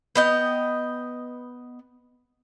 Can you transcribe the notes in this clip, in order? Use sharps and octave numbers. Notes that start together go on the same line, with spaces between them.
B3 D#5 G5